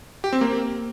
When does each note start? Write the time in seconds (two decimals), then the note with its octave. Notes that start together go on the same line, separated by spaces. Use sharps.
0.24 G4
0.33 C4
0.41 A#3